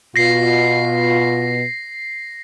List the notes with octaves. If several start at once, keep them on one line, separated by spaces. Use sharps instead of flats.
B2 F4 A#6 C7